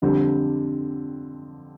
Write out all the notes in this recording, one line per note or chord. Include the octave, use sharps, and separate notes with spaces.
F2 D3 G3 C4